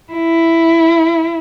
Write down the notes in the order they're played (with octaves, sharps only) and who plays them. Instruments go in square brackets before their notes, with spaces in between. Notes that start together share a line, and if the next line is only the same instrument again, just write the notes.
[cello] E4